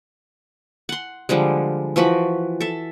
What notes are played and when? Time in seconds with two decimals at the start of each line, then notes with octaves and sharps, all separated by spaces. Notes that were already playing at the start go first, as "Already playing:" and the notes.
0.89 F#5 C6
1.29 D3 F3 G3 G#3
1.96 E3 F3 F#4 B5
2.60 A4 E5